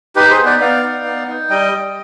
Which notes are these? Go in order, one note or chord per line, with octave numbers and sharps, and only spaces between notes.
D#4 G4 B4
G#4 C5
B3
B4 D5
B3 D5 F5
D#4
B3
D#4
G3 D#5 G5
G3